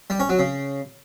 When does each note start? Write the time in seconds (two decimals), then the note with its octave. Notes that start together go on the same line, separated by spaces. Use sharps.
0.10 G3
0.20 C#4
0.29 F#3
0.39 C#3